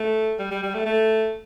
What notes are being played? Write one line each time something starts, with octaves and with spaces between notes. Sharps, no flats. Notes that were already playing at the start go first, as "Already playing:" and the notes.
Already playing: A3
G3
G3
G3
A3
A3